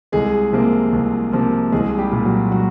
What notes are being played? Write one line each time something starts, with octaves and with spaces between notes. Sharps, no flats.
C2 G#3 G#4
C3 F3 A#3
C2
C3 F3 A#3
C2 G#3 G#4
G3 G4
A#2 G3
F#3 F#4
F#3 F#4